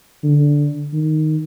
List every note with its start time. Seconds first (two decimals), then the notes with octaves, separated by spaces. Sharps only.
0.24 D3
0.93 D#3